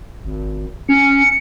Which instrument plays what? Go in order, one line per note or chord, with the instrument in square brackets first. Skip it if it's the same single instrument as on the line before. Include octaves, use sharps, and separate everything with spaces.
[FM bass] G#1
[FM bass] C#4 [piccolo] C#7